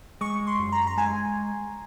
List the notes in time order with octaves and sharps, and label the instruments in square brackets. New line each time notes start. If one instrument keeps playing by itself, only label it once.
[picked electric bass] G#3 [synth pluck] C#6
[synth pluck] C6
[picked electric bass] F#2
[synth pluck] A#5
A#5
[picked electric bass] G#3 [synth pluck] G#5